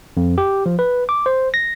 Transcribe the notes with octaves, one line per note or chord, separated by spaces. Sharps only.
F2
G4
F3
B4
D6
C5
A#6